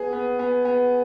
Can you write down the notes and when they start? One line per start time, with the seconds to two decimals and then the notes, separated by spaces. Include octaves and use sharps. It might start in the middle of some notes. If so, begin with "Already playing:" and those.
Already playing: B3 G#4
0.13 B3
0.39 B3
0.65 B3